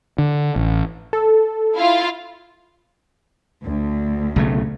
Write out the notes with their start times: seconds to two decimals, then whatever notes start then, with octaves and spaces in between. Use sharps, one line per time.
0.18 D3
0.56 A1
1.13 A4
1.75 E4 F4 F5
3.64 D2
4.36 B1 C#3 A3